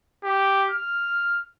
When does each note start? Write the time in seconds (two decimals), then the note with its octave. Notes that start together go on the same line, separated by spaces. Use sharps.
0.24 G4
0.70 F6